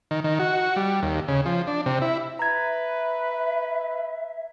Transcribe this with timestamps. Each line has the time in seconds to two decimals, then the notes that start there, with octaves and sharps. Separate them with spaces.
0.11 D#3
0.24 D#3
0.39 F#4
0.76 G3
1.03 D#2
1.28 C#3
1.46 F3
1.67 D4
1.86 C3
2.02 E4
2.39 B4 E5 A#5 G#6